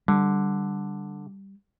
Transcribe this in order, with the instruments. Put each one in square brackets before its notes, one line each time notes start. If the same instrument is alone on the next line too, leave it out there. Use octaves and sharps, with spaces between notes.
[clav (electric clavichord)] D3 [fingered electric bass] G3